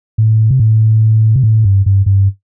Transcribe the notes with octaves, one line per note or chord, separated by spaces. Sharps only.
A2
C3
A2
C3
A2
G2
G2
G2